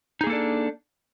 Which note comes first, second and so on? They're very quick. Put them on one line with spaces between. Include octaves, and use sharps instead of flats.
D#4 G#4 A#3 A4 D4